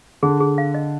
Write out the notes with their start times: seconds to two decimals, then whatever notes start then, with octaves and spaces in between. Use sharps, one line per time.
0.23 D3 G#4
0.41 G#4
0.58 F5
0.74 D#5